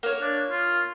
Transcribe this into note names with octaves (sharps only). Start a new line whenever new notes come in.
A#3 C#5
D4
F4